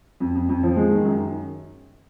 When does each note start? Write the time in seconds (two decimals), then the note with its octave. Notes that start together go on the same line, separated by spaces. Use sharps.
0.20 F2
0.35 F2
0.49 F2
0.63 F3
0.77 G#3
0.91 D#3
1.05 F#2